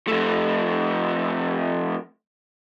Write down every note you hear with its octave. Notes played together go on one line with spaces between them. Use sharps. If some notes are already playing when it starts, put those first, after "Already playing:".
F2 A3